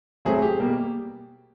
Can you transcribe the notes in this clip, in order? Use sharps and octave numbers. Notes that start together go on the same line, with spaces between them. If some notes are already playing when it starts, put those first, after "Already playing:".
A2 F#3 A3 C4 G#4
G4
B2 G3 A#3